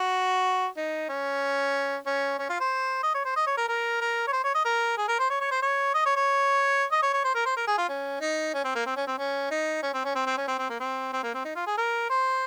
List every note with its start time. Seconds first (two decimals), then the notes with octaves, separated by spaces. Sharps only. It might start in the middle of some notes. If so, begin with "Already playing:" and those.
Already playing: F#4
0.77 D#4
1.09 C#4
2.06 C#4
2.39 C#4
2.49 F4
2.60 C5
3.03 D#5
3.14 C#5
3.25 C5
3.36 D#5
3.47 C#5
3.57 A#4
3.68 A#4
4.01 A#4
4.28 C#5
4.33 C5
4.44 C#5
4.54 D#5
4.65 A#4
4.98 G#4
5.08 A#4
5.19 C5
5.30 C#5
5.41 C#5
5.51 C5
5.62 C#5
5.94 D#5
6.06 C#5
6.16 C#5
6.91 D#5
7.02 C#5
7.13 C#5
7.24 C5
7.35 A#4
7.45 C5
7.57 A#4
7.67 G#4
7.78 F4
7.89 C#4
8.21 D#4
8.54 C#4
8.64 C4
8.75 A#3
8.86 C4
8.96 C#4
9.07 C4
9.18 C#4
9.51 D#4
9.83 C#4
9.94 C4
10.05 C#4
10.15 C4
10.26 C4
10.37 C#4
10.48 C4
10.58 C4
10.70 A#3
10.80 C4
11.13 C4
11.23 A#3
11.34 C4
11.45 D#4
11.56 F4
11.67 G#4
11.77 A#4
12.10 C5